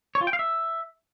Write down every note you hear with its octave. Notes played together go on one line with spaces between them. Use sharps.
C#5
F4
G5
F5
E5